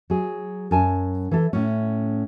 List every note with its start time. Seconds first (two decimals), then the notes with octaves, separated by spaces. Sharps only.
0.10 F#3 G#4
0.71 F#2 G#5 A5
1.31 E3 A4
1.53 A2 C#4